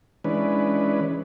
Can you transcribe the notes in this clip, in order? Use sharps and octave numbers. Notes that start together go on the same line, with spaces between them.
E3 G#3 C#4 D4 B4